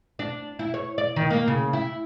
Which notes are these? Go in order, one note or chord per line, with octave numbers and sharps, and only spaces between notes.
D4
E4
C#5
D5
D#3
A#3
C#3
E4